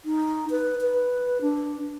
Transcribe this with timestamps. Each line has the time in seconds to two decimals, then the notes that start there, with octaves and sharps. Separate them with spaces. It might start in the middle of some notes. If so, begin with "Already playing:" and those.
0.05 D#4
0.50 B4
0.81 B4
1.41 D4